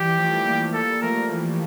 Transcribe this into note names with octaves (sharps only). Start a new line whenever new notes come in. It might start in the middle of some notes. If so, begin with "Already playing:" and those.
Already playing: E3 G3 G4
F3 A3
G3 A#3
G3 A#3 A4
F3 A3 A#4
E3 G3